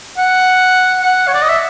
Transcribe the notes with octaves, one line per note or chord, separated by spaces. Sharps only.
F#5
F#5
C#5
D5
D#5
E5